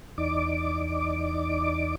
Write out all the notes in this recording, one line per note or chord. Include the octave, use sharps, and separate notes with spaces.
E2 D#4 D5 D6